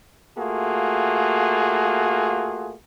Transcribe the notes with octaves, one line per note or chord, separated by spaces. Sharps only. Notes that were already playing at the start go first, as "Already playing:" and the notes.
A3 A#3 F4 F#4 G#4